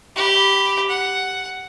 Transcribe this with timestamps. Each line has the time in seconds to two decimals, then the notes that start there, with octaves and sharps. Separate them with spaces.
0.16 G4 B5
0.89 F#5